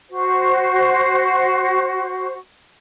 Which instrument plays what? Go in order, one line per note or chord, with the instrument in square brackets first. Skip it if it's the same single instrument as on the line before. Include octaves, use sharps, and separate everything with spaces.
[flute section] F#4 C5